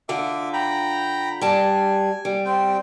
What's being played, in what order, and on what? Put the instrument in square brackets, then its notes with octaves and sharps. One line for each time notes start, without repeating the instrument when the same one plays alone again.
[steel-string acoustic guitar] D3 F4 [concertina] E5 D6
[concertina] G5 A#5 B5
[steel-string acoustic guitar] G3 A5 [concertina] G#5
[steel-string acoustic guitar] G3
[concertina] C4 G5